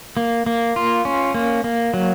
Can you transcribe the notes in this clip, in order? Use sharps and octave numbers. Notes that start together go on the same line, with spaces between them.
A#3
A#3
F4
C#4
A#3
A#3
F#3